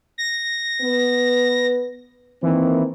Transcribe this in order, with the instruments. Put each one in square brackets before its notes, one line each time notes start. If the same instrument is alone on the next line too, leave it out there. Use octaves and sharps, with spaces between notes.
[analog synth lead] A#6
[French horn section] B3 B4
[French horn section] D#3 A#3 C4 [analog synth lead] E3